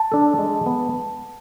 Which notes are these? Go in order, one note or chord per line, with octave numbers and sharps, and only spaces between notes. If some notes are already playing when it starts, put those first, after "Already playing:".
Already playing: A5
D4 A4
G#3
B3